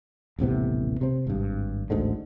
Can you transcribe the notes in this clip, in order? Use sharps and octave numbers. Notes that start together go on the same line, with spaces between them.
D#1 A1 C3 B3
C3 C4
G#1 G2
A1 D2 G#2 D3